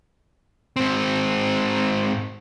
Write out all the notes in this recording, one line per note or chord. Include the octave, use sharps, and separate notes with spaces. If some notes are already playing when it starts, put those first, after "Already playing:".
G#2 C4